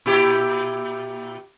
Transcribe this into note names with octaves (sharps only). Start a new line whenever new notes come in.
A#2 E4 G4